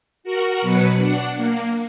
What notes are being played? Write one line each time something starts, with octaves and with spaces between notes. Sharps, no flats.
F#4 A#4 F#5
B2 F#3 B4 C#7
D4 F#5
A#3